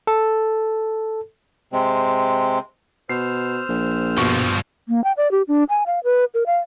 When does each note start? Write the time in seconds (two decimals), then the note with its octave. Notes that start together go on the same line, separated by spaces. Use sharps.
0.07 A4
1.73 C3 G#3 C4
3.09 B2 C5 E6 F6 C7
3.69 A#1
4.18 G2 B2 F3 C#6
4.89 A#3
5.04 G5
5.17 D5
5.31 G4
5.48 D4
5.69 G#5
5.87 F5
6.04 B4
6.34 A#4
6.46 F5